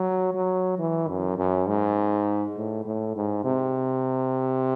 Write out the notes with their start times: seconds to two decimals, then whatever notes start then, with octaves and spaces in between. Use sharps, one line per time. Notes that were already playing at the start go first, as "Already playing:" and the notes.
Already playing: F#3
0.34 F#3
0.78 E3
1.08 F#2
1.38 F#2
1.67 G#2
2.56 A2
2.85 A2
3.16 G#2
3.44 C3